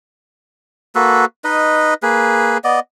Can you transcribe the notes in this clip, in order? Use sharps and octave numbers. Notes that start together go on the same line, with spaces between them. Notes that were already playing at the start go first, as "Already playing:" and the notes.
A#3 F#4 A4 B4
D#4 B4 D#5
A#3 G#4 B4
B3 D5 D#5